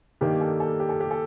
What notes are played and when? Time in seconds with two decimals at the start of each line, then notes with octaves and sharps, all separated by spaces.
0.21 G2 D#3 A#3 D#4 G4
0.41 A4
0.60 A4
0.80 G4
0.89 A4
1.01 G4
1.11 A4